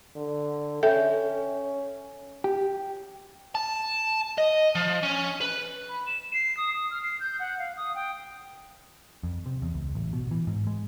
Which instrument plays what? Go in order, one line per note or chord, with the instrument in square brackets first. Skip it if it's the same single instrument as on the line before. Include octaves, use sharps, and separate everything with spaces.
[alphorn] D3
[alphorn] C#4 [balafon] A4 E5 G5
[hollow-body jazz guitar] G4
[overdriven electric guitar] A5
D#5
F3
C#4
B4
[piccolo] B5
E7
C7
D#6
D#6
F6
C7
G6
F#5
F5
D#6
G5
[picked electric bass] F2
C3
E2
C#2
A1
B2
E3
G#2
G#3